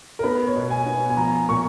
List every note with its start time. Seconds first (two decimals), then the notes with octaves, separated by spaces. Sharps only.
0.19 A#4
0.23 B3 B4
0.47 C#5
0.55 B2
0.70 G#5
0.86 B3
1.10 G#5
1.17 F3 A#5
1.49 A#2 C#6